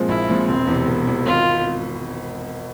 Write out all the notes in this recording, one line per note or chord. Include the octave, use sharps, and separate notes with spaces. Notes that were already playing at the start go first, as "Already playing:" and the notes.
Already playing: A#2 F3 G#3 C4
A#1 E4
A#2 F3 G#3 C4
E1 C4
E2 C3
E1
E2 C3
G#1 F4